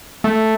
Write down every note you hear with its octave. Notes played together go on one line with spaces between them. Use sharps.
A3